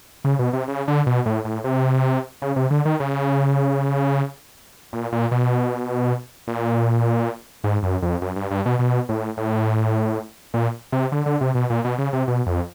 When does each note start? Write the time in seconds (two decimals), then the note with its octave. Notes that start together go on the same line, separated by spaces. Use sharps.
0.24 C#3
0.39 B2
0.53 C3
0.68 C#3
0.88 D3
1.06 B2
1.26 A2
1.45 A2
1.64 C3
2.42 C#3
2.56 C3
2.70 D3
2.85 D#3
3.00 C#3
4.93 A#2
5.12 A#2
5.31 B2
6.48 A#2
7.64 G#2
7.83 F#2
8.02 F2
8.22 F#2
8.36 G2
8.51 G2
8.66 B2
8.79 B2
9.09 A2
9.37 A2
10.54 A#2
10.92 C3
11.12 D3
11.26 D3
11.41 C3
11.55 B2
11.70 A#2
11.85 B2
11.98 C#3
12.13 C3
12.28 B2
12.46 F2